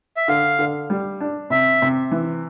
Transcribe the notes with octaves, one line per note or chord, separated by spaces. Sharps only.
E5
D3 F5
D3
G3
D4
C3 E5
C3
E3